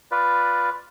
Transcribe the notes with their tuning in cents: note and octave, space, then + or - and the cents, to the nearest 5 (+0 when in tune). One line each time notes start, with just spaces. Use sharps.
F4 +5 B4 +0 D5 +0